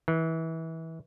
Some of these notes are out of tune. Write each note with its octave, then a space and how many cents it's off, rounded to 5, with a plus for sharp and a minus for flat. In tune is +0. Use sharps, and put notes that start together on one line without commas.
E3 -25